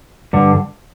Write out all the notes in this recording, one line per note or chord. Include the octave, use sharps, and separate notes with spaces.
G2 D3